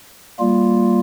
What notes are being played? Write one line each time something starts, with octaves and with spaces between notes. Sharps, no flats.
G3 A#3 F4